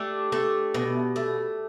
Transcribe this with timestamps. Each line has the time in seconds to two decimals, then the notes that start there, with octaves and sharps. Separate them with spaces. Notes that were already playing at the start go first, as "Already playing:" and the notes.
Already playing: A3 D4 G4
0.32 A3
0.74 B2
1.16 A3